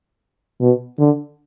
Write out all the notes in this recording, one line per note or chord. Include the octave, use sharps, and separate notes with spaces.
B2
D3